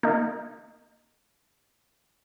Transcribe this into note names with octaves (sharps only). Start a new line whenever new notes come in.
A#3 D#4